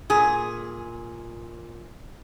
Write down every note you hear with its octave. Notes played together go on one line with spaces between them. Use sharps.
A#2 G#4